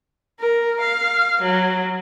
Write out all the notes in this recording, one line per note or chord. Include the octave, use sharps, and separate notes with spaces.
A#4
F5
F#3